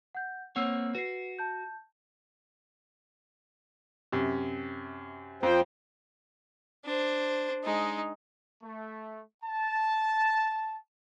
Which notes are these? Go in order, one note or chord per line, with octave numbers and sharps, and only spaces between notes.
F#5 G6
A#3 C4 C#5 F#5 E6
F#4 B4 C7
A5 G6
F#2 C3
F2 F3 C5 G5
D4 C5
G#3 D#4
A3
A5